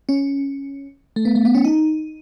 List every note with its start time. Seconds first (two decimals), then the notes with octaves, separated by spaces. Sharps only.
0.09 C#4
1.16 A3
1.25 B3
1.35 A3
1.45 B3
1.55 C#4
1.64 D#4